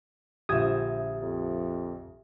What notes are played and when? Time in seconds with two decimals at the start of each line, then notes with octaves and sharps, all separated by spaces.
0.49 A#1 D3 F3 G4 E5 D#6 G#6
1.21 F2